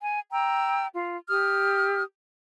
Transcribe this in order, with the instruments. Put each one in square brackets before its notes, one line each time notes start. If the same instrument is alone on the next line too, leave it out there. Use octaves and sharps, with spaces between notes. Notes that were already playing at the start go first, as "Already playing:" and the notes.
[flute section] G#5
G5 A#5 E6
F4
G4 D#6 F6